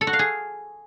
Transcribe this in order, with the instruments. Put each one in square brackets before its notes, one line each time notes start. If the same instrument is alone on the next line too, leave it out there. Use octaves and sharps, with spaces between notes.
[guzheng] A4
F#4
F5
G#4